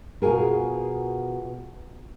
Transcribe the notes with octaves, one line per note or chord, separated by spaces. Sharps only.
B2 F4 F#4 G#4 A#4